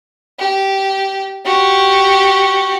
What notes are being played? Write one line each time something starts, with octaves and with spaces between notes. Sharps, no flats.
G4
F#4 G4